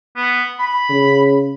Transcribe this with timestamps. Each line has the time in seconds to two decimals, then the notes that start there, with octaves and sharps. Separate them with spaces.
0.16 B3
0.59 B5
0.90 C#3